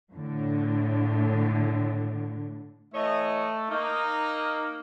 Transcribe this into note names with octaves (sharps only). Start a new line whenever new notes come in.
A2 D3
E3 A3 C#5 D#5
A#3 D#4